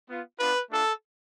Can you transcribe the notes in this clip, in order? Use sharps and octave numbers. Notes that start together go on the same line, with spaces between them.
B3 F4
B3 D4 F4 B4
A3 D4 F4 A4